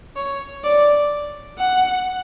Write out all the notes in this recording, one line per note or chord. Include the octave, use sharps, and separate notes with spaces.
C#5
D5
F#5